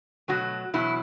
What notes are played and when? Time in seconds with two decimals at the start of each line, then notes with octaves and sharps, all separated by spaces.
0.28 B2 F#3 A3 F#4
0.74 E2 B2 F#3 E4